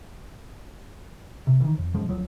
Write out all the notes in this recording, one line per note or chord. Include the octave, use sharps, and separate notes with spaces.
C3
D#3 E3
F2
D#1 F#2 F3 G#3
D2 F3 F#3